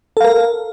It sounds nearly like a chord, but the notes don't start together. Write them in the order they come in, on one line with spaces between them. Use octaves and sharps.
A4 F5 A#4